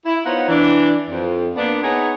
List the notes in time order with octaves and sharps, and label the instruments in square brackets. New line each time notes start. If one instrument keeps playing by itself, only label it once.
[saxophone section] E4
B3 D#4 F4 C5 C#5 F#5
E3 D4
F2
A#3 B3 D4
B3 D#4 G#4 B4 C#5